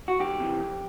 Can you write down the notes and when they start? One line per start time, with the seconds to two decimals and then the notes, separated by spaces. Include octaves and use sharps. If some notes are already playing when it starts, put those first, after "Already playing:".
0.08 F#4
0.20 F2 G4
0.40 C3 E3
0.60 F2